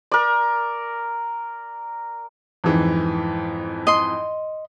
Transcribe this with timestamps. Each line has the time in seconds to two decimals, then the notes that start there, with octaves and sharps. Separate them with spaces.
0.12 A#4 D5
2.64 F2 G#2 E3
3.87 D#5 C6